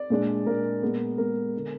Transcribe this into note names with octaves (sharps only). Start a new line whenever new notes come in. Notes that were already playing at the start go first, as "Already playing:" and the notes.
Already playing: D5
A#2 G#3 D4
A#2 G#3 D4 A#4
A#2 G#3 B3
A#2 G#3 B3 A#4
D3